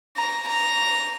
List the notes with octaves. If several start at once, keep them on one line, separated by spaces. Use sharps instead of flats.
A#5
A#5